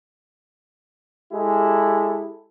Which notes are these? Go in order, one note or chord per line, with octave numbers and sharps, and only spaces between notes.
G#3 E4 G4 A4